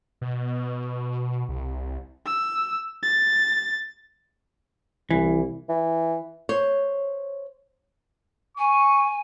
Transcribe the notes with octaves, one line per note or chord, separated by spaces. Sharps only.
B2
C2
E6
A6
C2 E3
E3
C5 C#5
G#5 C#6